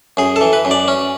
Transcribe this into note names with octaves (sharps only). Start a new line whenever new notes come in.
F#2 G#4
A4
E3
B4
F#2
D5
C#4